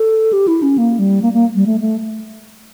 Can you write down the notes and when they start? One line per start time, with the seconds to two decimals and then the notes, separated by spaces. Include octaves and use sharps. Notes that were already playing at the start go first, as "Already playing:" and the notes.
Already playing: A4
0.33 G4
0.48 E4
0.62 C#4
0.78 A#3
0.99 G3
1.22 A#3
1.33 A#3
1.55 G3
1.67 A3
1.80 A3